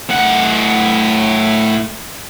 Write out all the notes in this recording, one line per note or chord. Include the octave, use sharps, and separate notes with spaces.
A2 F#5